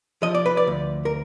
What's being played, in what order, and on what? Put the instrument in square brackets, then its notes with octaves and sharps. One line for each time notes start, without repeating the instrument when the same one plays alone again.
[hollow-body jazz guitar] F3 D#5
D5
B4
D5
D2
A#4